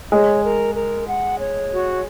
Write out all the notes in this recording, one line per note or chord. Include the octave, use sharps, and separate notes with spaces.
G#3 C#5
A#4
A#4
F#5
C#5
F#4